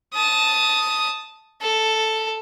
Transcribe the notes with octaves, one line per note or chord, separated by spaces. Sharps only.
A5 D#6
A4